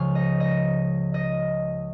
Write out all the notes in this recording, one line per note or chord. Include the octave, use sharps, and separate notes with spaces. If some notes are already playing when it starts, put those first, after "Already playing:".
Already playing: C#2 C#3 F3 G#3 C#5 F5
D#5
D#5
D#5